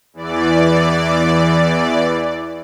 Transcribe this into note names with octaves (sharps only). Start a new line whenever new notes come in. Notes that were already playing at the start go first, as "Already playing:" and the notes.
E2 E3 D5